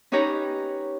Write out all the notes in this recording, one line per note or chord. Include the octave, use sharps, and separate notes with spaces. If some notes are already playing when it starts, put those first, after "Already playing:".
C#4 D#4 G4 B4 C#5 A#5